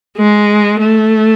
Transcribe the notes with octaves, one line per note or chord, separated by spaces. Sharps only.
G#3
A3